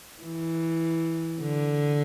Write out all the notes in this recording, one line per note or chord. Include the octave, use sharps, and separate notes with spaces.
E3
D3